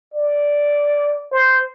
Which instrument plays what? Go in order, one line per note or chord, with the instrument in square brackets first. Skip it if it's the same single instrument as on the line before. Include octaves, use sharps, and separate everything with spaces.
[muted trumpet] D5
C5